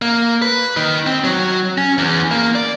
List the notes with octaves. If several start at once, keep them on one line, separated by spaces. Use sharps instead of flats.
A#3
B4
D#3
C4
F#3
C#4
E2
A#3
D5